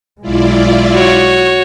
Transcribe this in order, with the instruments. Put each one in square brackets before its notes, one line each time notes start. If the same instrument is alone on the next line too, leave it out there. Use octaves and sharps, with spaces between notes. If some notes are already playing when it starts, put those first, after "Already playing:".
[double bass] B1 G#3 [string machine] E4 F4 D5
[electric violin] F#4 C#5